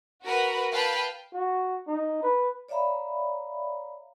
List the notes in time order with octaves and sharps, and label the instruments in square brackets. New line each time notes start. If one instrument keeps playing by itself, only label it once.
[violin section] F#4 A#4 B4 F#5
B4 F5 G5 A5
[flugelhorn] F#4
D#4
B4
[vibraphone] C#5 D5 E5 F5 A#5 B5